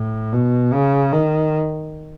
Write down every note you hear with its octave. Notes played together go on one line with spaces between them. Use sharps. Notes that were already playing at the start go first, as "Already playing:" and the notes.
Already playing: A2
B2
C#3
D#3